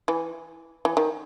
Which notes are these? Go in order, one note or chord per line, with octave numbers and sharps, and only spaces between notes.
E3
E3
D#3